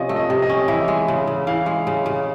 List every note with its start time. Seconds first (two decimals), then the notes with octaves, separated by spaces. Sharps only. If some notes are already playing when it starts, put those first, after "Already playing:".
Already playing: C3 F3 C#4 D5 D#5
0.09 A3
0.16 D#5
0.30 C3
0.42 D#5
0.50 C#4
0.68 E3 E5
0.88 G#3
1.08 C#3
1.27 C#3
1.47 E3 F5
1.66 G#3
1.87 C#3
2.06 C#3